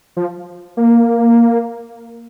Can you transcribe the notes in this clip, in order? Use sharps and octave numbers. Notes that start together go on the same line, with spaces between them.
F3
A#3